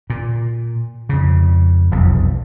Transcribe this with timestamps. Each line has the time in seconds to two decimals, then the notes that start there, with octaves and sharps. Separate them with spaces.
0.10 A#2
1.09 F2 C#3
1.91 F1 B1 E2